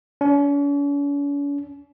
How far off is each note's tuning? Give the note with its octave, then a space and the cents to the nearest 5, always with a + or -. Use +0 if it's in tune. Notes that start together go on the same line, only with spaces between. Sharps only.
C#4 +45